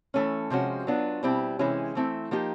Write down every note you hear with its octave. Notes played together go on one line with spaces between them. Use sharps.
E3 A3 C#4
C3 F3 G#3 C#4 F#4
F#3 B3 D4 F4
B2 G3 C4 E4 G4
C3 E3 G#3 C#4 E4
E3 A3 C4 E4
F3 A#3 D#4 G4